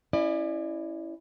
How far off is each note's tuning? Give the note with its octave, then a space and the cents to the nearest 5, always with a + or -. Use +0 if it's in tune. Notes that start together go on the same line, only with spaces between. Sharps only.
C#4 +0 E4 +0 D5 +40